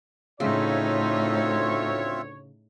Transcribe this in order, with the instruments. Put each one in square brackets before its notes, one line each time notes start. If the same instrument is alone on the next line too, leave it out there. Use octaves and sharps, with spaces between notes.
[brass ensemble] D2 C#5 [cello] A2 D#4 [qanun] C#3 [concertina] C4 F4 E5